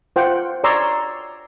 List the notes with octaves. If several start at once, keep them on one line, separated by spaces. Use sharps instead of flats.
F4 C5 F#5 G5
C#5 D5 A#5 C6 E6